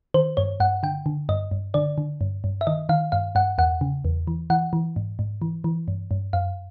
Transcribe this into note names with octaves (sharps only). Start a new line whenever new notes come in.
D#3 C5
G2 C#5
G2 F#5
D3 G5
D3
G2 D#5
G2
D3 D5
D3
G2
G2
E5
D#3 D#5
D#3 F5
G2 F5
G2 F#5
E2 F#5
C#3
E2
E3
E3 F#5
E3
G#2
G#2
E3
E3
G2
G2
F#2 F5